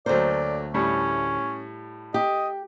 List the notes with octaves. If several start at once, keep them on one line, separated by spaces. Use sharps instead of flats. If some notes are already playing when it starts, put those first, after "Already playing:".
D2 F#3 A3 A#3 C5 D5
A2 G3 C#4
G4 D#5